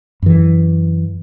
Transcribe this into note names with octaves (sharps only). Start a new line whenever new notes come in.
F#2 E3